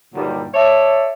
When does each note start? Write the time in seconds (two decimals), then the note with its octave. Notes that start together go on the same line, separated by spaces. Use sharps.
0.15 G2 A#2 D3 D#3 F#3 G3
0.54 A4 C#5 D5 E5